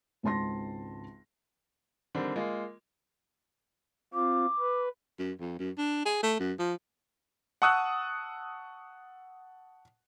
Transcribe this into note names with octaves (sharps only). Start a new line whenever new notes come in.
G#1 C#2 A5 C6 A#6
D3 D#3 G3 C4
G#3 A#3 F4
C4 F4 D6
B4
F#2
F2
F#2
D4
G#4
A3
F#2
F3
F#5 A5 C#6 D#6 E6 F#6